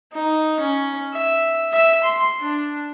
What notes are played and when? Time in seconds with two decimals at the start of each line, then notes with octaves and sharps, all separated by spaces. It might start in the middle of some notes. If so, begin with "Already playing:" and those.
0.13 D#4
0.60 C#4
1.13 E5
1.72 E5
2.03 C6
2.41 D4